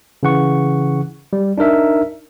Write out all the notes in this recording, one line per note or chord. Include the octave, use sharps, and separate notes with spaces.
C#3 E3 F#5 C#6
G3
D4 D#4 A#4 E5